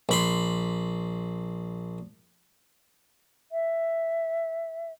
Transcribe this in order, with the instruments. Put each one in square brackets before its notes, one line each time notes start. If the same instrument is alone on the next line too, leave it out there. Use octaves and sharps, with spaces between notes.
[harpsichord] A#1 B5 C6
[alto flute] E5